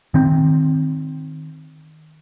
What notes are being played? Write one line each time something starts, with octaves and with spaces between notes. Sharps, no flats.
D#3 C4